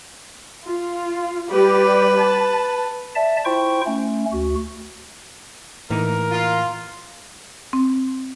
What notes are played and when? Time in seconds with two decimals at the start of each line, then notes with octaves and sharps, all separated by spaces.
0.66 F4
1.50 G3 G4 B4 D5
2.18 A5
3.15 D5 E5 A5
3.45 E4 F4 C5 G5 C#6
3.86 A3 C#4
4.32 D2 F#4
5.91 A2 E3 A#3 D#4 A#4
6.31 F4
7.73 C4